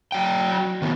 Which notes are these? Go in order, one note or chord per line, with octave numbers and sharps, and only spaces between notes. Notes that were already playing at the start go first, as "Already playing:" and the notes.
F#3 G5
D#3 B3